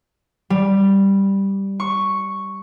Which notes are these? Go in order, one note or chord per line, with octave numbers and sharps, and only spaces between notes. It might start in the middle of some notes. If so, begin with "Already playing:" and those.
G3
C#6